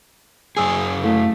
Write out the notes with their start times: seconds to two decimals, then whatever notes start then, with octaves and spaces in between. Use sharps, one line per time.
0.57 F#2 G#4 G#5 D#6 E6
1.03 A3 E4 A4 F5